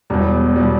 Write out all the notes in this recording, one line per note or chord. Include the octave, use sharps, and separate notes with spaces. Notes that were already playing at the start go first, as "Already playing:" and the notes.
E1 E2 B2 G3
B2 G3